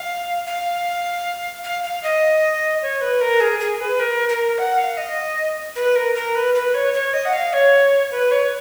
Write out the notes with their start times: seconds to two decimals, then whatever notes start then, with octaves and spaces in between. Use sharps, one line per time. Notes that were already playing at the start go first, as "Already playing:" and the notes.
Already playing: F5
0.46 F5
1.64 F5
1.84 F5
2.03 D#5
2.82 C#5
3.01 B4
3.21 A#4
3.40 G#4
3.60 G#4
3.80 B4
4.00 A#4
4.29 A#4
4.58 F#5
4.78 F5
4.97 D#5
5.76 B4
5.96 A#4
6.15 A#4
6.35 B4
6.55 B4
6.74 C#5
6.94 C#5
7.14 D#5
7.25 F#5
7.33 F5
7.53 C#5
8.11 B4
8.31 C#5